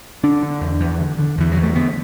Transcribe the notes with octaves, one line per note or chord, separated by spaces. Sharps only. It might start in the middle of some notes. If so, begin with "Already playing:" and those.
D3 D4
D3
E2
E2
D3
D3
E2 E3
E2 F#3
A3
D3 B3